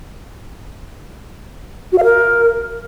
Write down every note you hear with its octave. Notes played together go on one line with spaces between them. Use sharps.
F#4
F5
A#4